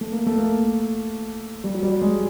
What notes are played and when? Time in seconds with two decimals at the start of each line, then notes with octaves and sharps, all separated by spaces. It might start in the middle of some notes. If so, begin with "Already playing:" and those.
0.01 A3
0.12 A#3
0.27 A3
0.38 A#3
1.64 G3
1.75 F#3
1.83 G3
2.02 G#3